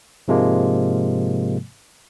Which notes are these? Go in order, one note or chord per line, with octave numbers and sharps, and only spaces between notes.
G#2 C3 F3 G#3 A#3